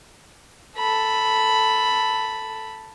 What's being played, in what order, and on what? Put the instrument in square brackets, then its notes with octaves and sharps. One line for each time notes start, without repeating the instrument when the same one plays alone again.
[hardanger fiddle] A4 B5